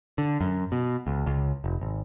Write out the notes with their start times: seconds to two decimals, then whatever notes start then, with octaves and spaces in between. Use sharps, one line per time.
0.18 D3
0.41 F#2
0.72 B2
1.07 C#2
1.26 C#2
1.64 F1
1.81 G#1